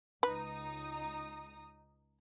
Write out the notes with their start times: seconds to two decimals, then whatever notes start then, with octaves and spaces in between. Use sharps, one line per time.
0.23 C#2 D#4 B4 D#6